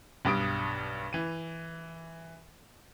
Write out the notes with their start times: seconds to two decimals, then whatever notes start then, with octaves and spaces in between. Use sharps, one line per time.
0.25 B1 G2 G3 D#6 D7
1.13 E3 D#7